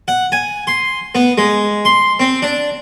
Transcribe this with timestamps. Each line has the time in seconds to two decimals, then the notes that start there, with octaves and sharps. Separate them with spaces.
0.08 F#5
0.32 G#5
0.67 C6
1.15 B3
1.38 G#3
1.85 C6
2.20 C4
2.42 D4